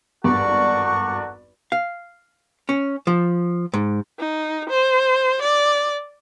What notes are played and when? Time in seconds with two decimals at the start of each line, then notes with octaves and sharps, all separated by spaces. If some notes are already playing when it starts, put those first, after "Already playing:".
0.24 G#1 E2 G2 F#4 A4 A#4 D5 C#6
1.72 F5
2.69 C#4
3.07 F3
3.74 G#2
4.19 D#4
4.70 C5
5.42 D5